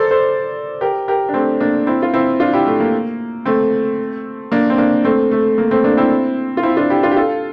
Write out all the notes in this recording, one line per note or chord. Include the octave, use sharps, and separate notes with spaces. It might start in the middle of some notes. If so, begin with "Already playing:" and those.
Already playing: A4 A#4 C5 D5
A4 C5
G4 A#4
G4 A#4
D4
A3 C4
A#3 D4
C4 E4
F4
C4 E4
D4 F4
E4 G4
A3
A#3
A3 C4
A#3 D4
C4
A#3 D4
A3 C4
A3
A#3
A3 C4
A#3 D4
C4 E4
F4
C4 E4
D4 F4
E4 G4
D4 F4
G4
F4 A4